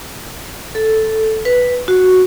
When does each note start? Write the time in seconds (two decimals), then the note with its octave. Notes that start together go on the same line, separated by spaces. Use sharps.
0.75 A4
1.45 B4
1.88 F#4